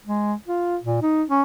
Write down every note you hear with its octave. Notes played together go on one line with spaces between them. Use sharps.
G#3
F4
A#2
D#4
C#4